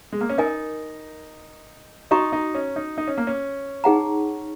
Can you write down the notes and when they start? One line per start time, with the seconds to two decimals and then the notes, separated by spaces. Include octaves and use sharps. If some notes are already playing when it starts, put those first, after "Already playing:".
0.13 G#3
0.21 A#3
0.29 C#4
0.38 D#4 A#4 D#5 G#5
2.11 D#4 F#4 D#5 A#5 C#6
2.33 D#4
2.54 C#4
2.76 D#4
2.98 D#4
3.07 C#4
3.18 A#3
3.27 C#4
3.84 D#4 G#4 F#5 A#5